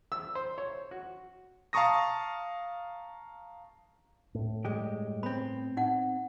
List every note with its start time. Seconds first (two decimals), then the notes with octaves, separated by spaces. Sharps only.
0.12 E6
0.35 C5
0.58 C#5
0.91 F#4
1.73 F5 A5 A#5 C#6 D#6 A#6
4.35 A2
4.65 G2 G#3 G4
5.23 B3 C4 B5
5.77 D#4 F#5